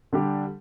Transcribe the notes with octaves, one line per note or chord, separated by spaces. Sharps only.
D3 G3 D4 G4